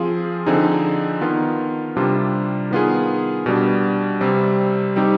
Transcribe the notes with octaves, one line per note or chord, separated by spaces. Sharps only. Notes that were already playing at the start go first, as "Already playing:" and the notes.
Already playing: F3 C4 F4 G#4
D3 F3 C4 D#4 G#4
D#3 B3 F4
C3 G3 D4 F4
D#3 B3 F4 G#4
B2 G3 D4
C3 G3 C4
G3 C4 D#4 G4